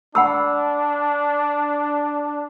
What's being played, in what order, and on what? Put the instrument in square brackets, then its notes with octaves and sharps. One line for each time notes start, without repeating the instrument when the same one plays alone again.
[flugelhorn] D4 [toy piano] F#5 B5 E6